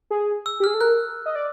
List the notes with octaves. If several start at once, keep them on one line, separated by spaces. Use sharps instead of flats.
G#4
E6
G4
G#4 F6
A4
A#4 F#6
D#5
D5